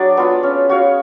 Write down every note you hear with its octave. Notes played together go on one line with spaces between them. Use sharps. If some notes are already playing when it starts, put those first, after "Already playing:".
Already playing: F#3 D4 G#4 D5
B3 F4
C#4
F#4 C#5 F5